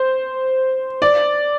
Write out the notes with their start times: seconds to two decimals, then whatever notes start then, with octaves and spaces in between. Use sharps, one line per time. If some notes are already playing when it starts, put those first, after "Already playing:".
Already playing: C5
1.02 D5